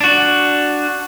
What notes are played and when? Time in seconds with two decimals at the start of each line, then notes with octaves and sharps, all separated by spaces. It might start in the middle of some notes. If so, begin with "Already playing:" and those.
0.01 D4 F#4